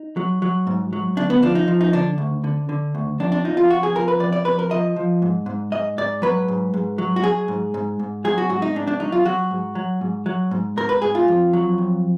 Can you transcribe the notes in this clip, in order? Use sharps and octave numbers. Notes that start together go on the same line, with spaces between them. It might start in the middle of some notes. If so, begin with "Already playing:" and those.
Already playing: D#4
F#3
F#3
G#2
F#3
D2 D4
B3
F3 D4
D#4
F3
D#4
D3 D4
D2
D3
D3
D2
F2 D4
D4
F3 D#4
F4
F2 F#4
G#4
F3 A#4
B4
F2 D5
D5
F2 B4
A#4
F3 D#5
F3
G#2
G#2
G#2 D#5
G#2 D5
F#3 B4
G#2
G#2
F#3
F#4
F#3 G#4
G#2
G#2
G#2
F#3 G#4
F#4
G#2 F#4
D#4
G#2 D4
D4
F#3 D#4
F4
F#3 F#4
G#2
F#3
G#2
F#3
G#2
G#2 A#4
B4
G#2 G#4
F4
F2
F#3
F2